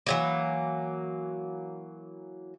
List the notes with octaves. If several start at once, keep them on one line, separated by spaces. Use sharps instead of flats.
E3 F#3 A#3